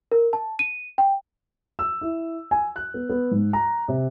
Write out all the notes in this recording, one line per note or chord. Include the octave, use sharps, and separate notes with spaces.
A#4
A5
D#7
G5
E6
E4
G#5
F#6
B3
B3
G#2
A#5
C3